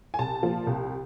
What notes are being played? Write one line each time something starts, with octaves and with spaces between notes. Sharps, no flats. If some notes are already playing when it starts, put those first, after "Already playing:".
G#5
C2 A5
A#2 F3
C2